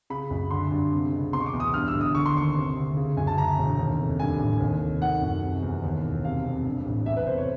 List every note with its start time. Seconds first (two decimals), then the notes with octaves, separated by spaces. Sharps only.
0.10 C#3 B5
0.31 F#2
0.51 D3 C6
0.71 G2
0.92 C3
1.12 C#2
1.33 B2 C6
1.40 C#6
1.46 D6
1.53 E2
1.60 D#6
1.73 G2 F6
1.88 E6
1.94 G1
2.01 D#6
2.15 D3 C#6
2.26 C6
2.35 D#2 C#6
2.56 C3
2.77 D2
2.97 C#3
3.17 F#2 G#5
3.27 A5
3.38 D2 A#5
3.59 E1
3.79 D#2
3.99 F1
4.20 G2 G#5
4.40 A1
4.60 D#2
4.81 F1
5.01 D#3 F#5
5.22 F#2
5.43 C3
5.63 E2
5.84 D#2
6.03 E1
6.24 C3 F5
6.45 F2
6.65 G2
6.86 A1
7.06 E2 E5
7.17 B4
7.27 F1 C5
7.38 C#5